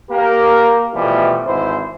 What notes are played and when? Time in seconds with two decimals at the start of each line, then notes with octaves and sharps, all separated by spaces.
0.11 A#3 G4 A#4
0.94 B2 E3 F3 G3 A3
1.46 G#1 E3 E4 C5